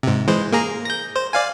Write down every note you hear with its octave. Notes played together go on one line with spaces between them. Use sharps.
G#2 C3
E3 G#3 C5
A#3 G#4 A#5
G6 A#6
C5
D5 F5 G#5